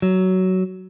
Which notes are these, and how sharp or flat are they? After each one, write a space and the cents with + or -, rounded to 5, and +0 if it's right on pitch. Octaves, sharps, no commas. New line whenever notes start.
F#3 +15